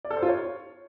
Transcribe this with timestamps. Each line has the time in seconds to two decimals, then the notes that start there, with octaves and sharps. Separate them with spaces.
0.05 D5
0.11 A4
0.16 C5
0.22 F4
0.28 C#5